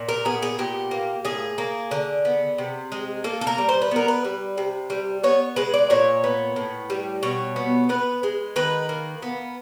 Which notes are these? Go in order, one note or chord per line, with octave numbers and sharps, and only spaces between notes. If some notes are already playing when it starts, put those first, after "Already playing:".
Already playing: A#2
A#4
B3 G#4
G#4
A#2 G4
A#3
A2 G#4
A#3
D3
B3
C3
G#3
A#3 A4
A4
A#4
G3
C5
B4
B3 A#4
B4
G3
C3
G3
B3 C#5
G#3 B4
D5
A#2 C#5
B3
A2
G3
B2 C#5
B3
B3 B4
G#3
D#3 B4
A#3
B3